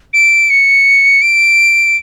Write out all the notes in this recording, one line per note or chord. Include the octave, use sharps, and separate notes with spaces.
D7
C#7
D7